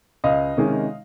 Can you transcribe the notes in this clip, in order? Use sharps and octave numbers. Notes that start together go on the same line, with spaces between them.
C#2 D#5 F5
C3 D#3 G#3 C#4